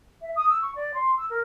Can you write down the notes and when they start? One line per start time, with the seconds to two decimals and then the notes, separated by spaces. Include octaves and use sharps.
0.21 E5
0.35 D#6
0.49 E6
0.61 C#6
0.75 D5
0.94 C6
1.17 E6
1.29 A#4